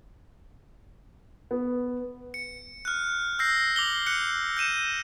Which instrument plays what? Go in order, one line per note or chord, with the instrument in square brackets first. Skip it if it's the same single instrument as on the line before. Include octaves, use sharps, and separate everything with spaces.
[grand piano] B3
[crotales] C#7
F6 F#6
E6 G6 A#6 C7
D6 F#7 G7
F#6 C#7
G6 C#7 D#7 E7